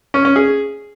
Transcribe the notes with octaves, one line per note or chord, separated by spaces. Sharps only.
C#4
C#4
G#4